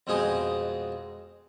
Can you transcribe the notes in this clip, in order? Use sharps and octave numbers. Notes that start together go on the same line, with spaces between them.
F2 B2 G#3 D#4 G#5 D#6